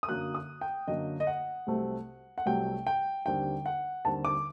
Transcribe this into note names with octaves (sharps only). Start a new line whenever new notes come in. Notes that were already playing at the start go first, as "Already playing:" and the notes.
D#6
F#2 D3 F#3 A#3 F#6
D#6
G5
F#2 D3 F#3 A#3 D#5
D#5
F#5
C2 C3 F#3 A3 C4
F#5
C2 C3 F#3 A3 C4 G5
G5
D#2 D3 G3 C4 G5
F#5
D#2 D3 G3 C4 A5
D6